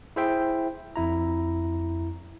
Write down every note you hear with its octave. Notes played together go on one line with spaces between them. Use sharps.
E4 G#4 C5 E5 G5
F2 E4 A#5